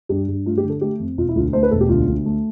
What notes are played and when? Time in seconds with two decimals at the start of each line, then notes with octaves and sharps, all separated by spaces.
0.09 G2 G4
0.28 G2
0.46 A3 F4
0.58 G4
0.64 D3
0.70 A4
0.81 A3 G4
0.99 F2
1.17 E1 F4
1.29 E4
1.36 D2 F4
1.53 A3 C5
1.63 B4
1.71 E1 A4
1.81 G4
1.89 D2 F4
2.08 D2
2.26 A3